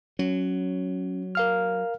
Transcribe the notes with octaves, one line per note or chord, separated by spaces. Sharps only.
F#3 C#4
A#4 F5 F6